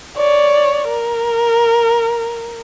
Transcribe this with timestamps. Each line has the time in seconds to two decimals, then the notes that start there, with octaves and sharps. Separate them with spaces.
0.16 C#5 D5
0.88 A#4